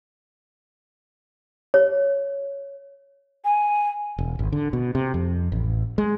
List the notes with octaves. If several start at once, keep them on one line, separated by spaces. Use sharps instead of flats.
C#5
G#5
E1
G#1
D3
B2
C3
F2
A1
G#3